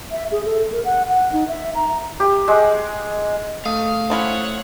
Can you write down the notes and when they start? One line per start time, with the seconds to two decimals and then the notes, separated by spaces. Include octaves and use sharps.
0.11 E5
0.32 G#4
0.45 A4
0.72 A#4
0.85 F#5
1.09 F#5
1.33 D#4
1.48 E5
1.75 A#5
2.20 G4
2.48 G#3
3.65 A3 F5 D#6
4.10 C#4 E4 C5 C#5 F#5